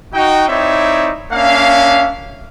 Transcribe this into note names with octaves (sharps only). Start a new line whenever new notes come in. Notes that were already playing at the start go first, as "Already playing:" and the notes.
D#4 F#4 G5
C4 D#4 E4 C#5 D5 E5
A#3 C#4 D4 E5 F5